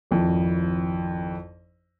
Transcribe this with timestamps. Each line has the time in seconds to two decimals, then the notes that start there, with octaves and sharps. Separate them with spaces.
0.11 G#1 F2 F3 E4